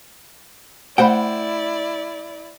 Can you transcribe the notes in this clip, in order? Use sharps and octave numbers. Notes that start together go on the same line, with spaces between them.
A3 E4 C5 D5 F#5 G5 B5